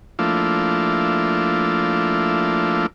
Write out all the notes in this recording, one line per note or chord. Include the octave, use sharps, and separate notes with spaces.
F3 A3 A#3 D4 E4 F4